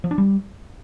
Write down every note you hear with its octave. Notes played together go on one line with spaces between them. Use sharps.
F3
D4
G3